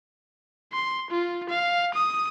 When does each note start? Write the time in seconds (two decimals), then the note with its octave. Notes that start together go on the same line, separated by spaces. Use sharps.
0.72 C6
1.10 F4
1.50 F5
1.94 D#6